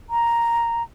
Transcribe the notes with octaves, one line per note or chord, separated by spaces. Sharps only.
A#5